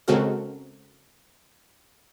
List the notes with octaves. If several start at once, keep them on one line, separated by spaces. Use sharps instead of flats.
C#3 G#3 C4 F#4 A4 A#4